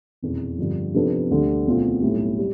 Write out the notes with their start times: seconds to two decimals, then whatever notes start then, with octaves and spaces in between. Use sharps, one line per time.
0.22 F1 E2 B2
0.58 G2 D3 F3
0.94 C3 F3 B3 D4 A4
1.31 D2 D3 G3
1.66 E2 B2 A3 C4 F4
2.02 B1 A2 G3
2.39 G3